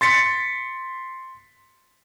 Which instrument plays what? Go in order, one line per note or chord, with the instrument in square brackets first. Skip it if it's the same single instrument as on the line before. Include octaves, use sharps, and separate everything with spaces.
[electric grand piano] C6 A6 B6 C#7